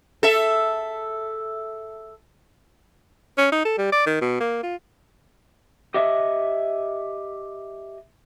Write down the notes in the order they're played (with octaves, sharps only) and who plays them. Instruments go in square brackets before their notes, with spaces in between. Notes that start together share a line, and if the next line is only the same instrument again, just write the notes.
[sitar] A4 E5
[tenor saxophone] C#4
D#4
A4
G3
D5
D#3
B2
A#3
F4
[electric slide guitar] G4 D#5 E5